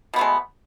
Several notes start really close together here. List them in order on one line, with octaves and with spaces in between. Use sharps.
B2 B3 A3 G#3